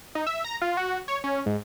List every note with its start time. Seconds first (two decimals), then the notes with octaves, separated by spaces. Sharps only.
0.15 D#4
0.27 E5
0.45 A#5
0.62 F4
0.77 F#4
1.08 C#5
1.24 C#4
1.46 G#2